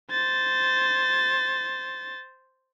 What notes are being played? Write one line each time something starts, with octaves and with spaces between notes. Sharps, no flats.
C5 A6